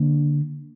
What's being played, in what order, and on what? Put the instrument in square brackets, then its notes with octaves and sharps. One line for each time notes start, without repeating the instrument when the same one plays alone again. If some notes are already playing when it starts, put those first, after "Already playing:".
Already playing: [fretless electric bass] D3 A#3 D4